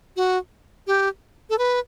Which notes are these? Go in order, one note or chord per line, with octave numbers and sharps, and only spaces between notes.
F#4
G4
A4
B4